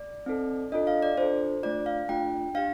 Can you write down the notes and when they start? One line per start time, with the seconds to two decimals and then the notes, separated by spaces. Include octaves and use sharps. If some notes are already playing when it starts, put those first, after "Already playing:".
Already playing: D5
0.26 C4 D#4 A4
0.72 D4 F4 A4 D#5
0.87 F5
1.03 D5
1.17 D4 F4 A4 C5
1.63 A3 D4 F4 D5
1.86 F5
2.09 A3 D4 F4 G5
2.55 D4 G4 F5